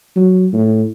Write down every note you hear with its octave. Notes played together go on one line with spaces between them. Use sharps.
F#3
A2